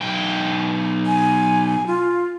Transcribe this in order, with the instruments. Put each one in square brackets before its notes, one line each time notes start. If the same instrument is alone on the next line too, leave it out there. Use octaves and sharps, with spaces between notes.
[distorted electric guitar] B1 G5
[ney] G#5
F4